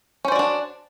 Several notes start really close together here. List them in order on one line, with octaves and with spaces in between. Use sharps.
C#4 C5 D5 F#4 D4